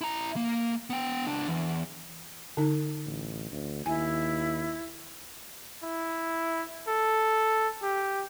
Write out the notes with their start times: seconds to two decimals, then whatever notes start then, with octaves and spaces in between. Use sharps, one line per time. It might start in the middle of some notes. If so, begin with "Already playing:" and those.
0.01 E4 A#5
0.36 A#3
0.90 B3 G5
1.27 C#2 D4
1.47 E2
2.57 D3 D#4
3.06 A1
3.51 D2
3.86 D#2 E4 G#5
5.83 E4
6.88 A4
7.82 G4